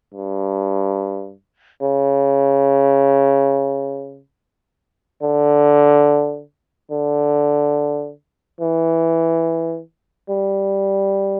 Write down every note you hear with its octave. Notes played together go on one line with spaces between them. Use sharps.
G2
C#3
D3
D3
E3
G3